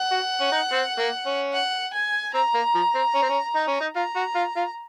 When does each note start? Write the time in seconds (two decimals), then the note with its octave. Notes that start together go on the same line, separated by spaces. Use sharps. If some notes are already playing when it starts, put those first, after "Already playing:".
Already playing: F#5
0.12 F#4
0.41 C#4
0.52 D#4
0.72 C4
0.99 A#3
1.26 C#4
1.53 F#5
1.93 G#5
2.34 C4 A#5
2.54 A#3
2.75 F3
2.95 C4
3.15 C#4
3.22 C4
3.29 C#4
3.56 D#4
3.68 C#4
3.81 D#4
3.96 F4 A#5
4.16 F#4
4.36 F4
4.56 F4